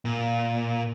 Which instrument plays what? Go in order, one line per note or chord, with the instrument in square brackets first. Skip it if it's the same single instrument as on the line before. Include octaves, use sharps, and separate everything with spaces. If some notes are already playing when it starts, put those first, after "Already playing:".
[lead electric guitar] A#2